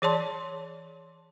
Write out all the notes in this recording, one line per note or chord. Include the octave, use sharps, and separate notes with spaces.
E3 G#4 C#5 D5 A5 C6